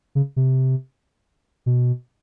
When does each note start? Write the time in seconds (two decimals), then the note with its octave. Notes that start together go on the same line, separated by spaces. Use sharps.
0.15 C#3
0.36 C3
1.66 B2